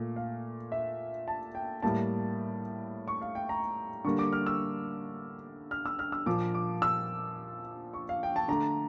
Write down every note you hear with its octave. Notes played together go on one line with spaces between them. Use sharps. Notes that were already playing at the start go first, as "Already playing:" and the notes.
Already playing: A#2 A3
F5
E5
A5
G5
A2 G3 A#3 A5
C#6
F5
G5
A#5
D3 G3 A#3 C#6
D6
F6
E6
F6
E6
F6
E6
A#2 F3 A#3 D6
D6
E6
C#6
F5
G5
A5
D3 A3 A#5